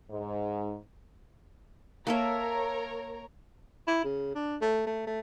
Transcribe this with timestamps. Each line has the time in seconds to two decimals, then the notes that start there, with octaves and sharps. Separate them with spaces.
0.10 G#2
2.07 A#3 A4 A#4 C#5 E5 A#5
3.88 E4
4.04 C#3
4.35 D4
4.62 A3
4.86 A3
5.07 A3